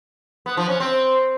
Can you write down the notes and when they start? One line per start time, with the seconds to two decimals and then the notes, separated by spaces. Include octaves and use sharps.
0.46 B3
0.57 F3
0.69 C#4
0.80 C4